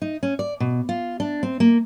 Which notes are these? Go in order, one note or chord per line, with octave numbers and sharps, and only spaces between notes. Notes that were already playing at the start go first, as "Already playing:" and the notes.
D#4
C#4
D5
B2
F4
D4
C4
A#3